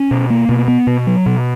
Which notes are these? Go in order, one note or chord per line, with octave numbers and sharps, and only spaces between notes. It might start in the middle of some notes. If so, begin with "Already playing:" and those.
Already playing: C#4
B2
A#3
B2
B3
B2
F#3
B2